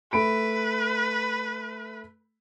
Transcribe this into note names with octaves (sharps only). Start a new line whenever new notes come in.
A3 B4 B5 D7